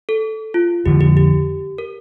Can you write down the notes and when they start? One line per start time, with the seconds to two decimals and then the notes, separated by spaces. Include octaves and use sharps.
0.09 A4
0.54 F4
0.86 F2 D3 F3 G4
1.01 G4
1.17 G4
1.78 A#4